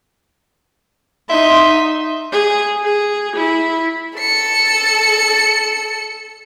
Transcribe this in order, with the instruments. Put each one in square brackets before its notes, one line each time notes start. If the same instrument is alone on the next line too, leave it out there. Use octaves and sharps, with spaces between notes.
[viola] D#4 C6 [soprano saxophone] E5
[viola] G#4
G#4
E4
[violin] A4 C#7